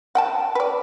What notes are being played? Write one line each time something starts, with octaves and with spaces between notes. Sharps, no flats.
F#5 G5 A5
B4 D5